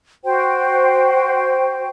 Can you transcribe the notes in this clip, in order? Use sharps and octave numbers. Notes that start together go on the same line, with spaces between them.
F#4 C5 G5